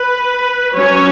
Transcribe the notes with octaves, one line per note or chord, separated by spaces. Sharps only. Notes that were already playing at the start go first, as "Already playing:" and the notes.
Already playing: B4
F#3 C#4 C#5